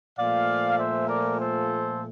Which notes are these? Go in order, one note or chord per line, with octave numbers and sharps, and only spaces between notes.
A#2 F3 A3 D5 F5
C5 E5
A#4 D5
A4 C5